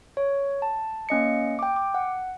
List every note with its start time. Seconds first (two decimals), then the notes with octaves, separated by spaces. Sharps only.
0.17 C#5
0.62 A5
1.09 A#3 C#4 D#5 C#7
1.59 G5 D6
1.76 D6
1.94 F#5